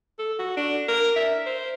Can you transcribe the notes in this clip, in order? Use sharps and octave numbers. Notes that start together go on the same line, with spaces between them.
A4
F#4
D4
A#4
E5
C5